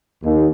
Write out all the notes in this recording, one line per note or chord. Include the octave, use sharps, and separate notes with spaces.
D#2